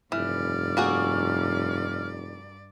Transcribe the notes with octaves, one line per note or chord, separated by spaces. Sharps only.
F1 G2 E3 D5 F6
A#3 F#4 G#4